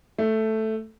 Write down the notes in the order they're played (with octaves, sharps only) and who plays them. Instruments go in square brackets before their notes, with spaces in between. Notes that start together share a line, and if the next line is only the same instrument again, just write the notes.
[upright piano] A3